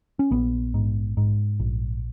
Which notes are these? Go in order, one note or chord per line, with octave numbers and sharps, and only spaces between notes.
C#4
A#1 B3
G#2
G#2
A#1